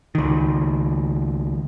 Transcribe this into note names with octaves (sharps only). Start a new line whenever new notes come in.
C#2 D#3